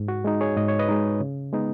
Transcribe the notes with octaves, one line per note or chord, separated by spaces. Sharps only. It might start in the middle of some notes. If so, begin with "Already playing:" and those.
Already playing: G#2
F#4
G#3 D#4
G#4 C#5
G#2 D#5
C#5
B4 D#5
G#3 D#4
C#3
G#3 B3 D#4